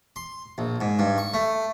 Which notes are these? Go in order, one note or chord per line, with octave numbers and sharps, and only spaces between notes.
C6
A#1
G#2
G2
C#6
A3